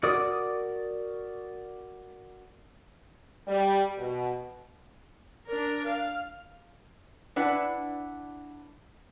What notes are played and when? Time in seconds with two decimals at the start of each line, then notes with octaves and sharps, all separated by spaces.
0.03 F#4 A#4 D5 D6 D#6
3.47 G3
3.98 B2
5.47 D4 A#4
5.86 F5
7.36 D4 E4 B4 D5 F#5